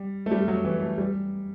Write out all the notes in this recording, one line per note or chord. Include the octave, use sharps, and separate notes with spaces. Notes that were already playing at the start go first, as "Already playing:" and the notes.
Already playing: G3
A3
G3
F#3
E3
A3
G3